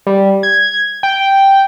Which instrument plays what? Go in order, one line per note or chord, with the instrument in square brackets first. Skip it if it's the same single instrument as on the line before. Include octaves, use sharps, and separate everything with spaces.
[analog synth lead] G3
G#6
G5